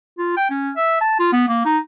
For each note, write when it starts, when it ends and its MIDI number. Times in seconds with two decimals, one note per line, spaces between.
0.18 0.33 65
0.37 0.47 79
0.50 0.71 61
0.76 1.00 76
1.01 1.15 81
1.19 1.30 65
1.32 1.45 59
1.48 1.63 58
1.65 1.78 63